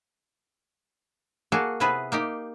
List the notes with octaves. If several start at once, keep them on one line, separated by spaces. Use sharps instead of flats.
A#3 F#4 G#4 A4
C3 B3 E4 G#4 B4
A#3 D#4 G4